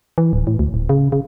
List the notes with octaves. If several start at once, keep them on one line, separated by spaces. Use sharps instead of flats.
E3
D1
A2
D2
D1
C#3
C#3